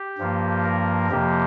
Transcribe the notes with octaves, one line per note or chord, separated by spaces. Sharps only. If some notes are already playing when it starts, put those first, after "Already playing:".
Already playing: G4
G2 F3 A#3
A#4
F2 C3 F3 A#3 G4